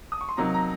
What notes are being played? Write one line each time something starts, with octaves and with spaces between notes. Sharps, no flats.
D#6
C#6
C6
C3 F#3 A#3 D#4 A#5
A#5